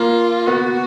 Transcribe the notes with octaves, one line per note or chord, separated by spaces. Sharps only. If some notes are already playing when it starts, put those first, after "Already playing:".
Already playing: A#3 F4
B3 F#4